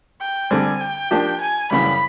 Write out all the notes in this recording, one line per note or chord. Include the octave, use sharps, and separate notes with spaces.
G5
D3 G3 C4 G#5
G5
F3 A#3 D4 G4
G#5
F#2 C#3 E3 G3 B5